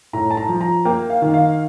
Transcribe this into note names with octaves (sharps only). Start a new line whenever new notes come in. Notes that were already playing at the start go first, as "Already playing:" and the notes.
A2 A#5
A5
A#5
F3
A#5
A#3 G5
F5
D#3
F5